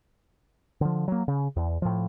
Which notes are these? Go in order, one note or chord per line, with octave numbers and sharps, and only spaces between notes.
D3 F3
F#3 A#3
C#3
E2
A2 F3